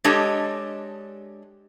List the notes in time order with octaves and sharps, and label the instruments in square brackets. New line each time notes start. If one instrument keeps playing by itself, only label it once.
[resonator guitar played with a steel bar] G#3 D4 G4 A4 C#5 D#5